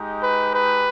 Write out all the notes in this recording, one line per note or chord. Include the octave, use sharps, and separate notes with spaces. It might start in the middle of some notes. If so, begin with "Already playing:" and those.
Already playing: G#3 D#4 G4
B4
B4